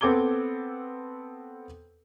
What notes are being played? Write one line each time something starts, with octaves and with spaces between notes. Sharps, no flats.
B3 C4 A4 D6 G#6 G7